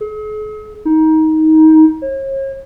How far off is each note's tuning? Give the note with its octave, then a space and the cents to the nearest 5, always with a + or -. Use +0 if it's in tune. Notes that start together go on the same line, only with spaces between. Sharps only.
G#4 +45
D#4 +20
C#5 -40